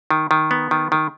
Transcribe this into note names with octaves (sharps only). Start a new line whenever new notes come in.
D#3
D#3
B3
D#3
D#3